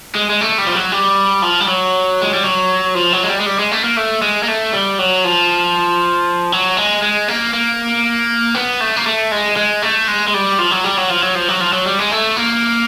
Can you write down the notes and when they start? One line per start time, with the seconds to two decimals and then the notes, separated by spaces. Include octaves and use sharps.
0.15 G#3
0.30 G#3
0.41 A3
0.58 G3
0.67 F3
0.75 F#3
0.92 G3
1.42 F3
1.60 G3
1.68 F#3
2.22 G#3
2.33 G3
2.44 F#3
2.95 F3
3.12 F#3
3.23 G#3
3.29 G3
3.40 G#3
3.46 G3
3.59 G#3
3.71 A3
3.84 A#3
3.97 A3
4.22 G#3
4.43 A#3
4.48 A3
4.73 G3
4.99 F#3
5.24 F3
6.52 F#3
6.77 G#3
7.02 G#3
7.28 A#3
7.54 A#3
8.55 B3
8.80 A3
8.96 A#3
9.07 A3
9.31 G#3
9.57 G#3
9.82 A3
10.08 G#3
10.28 G#3
10.34 G3
10.59 F3
10.71 F#3
10.84 G3
10.97 F#3
11.10 F3
11.23 F#3
11.35 F3
11.48 F#3
11.60 F3
11.73 F#3
11.86 G3
11.99 G#3
12.11 A3
12.37 A#3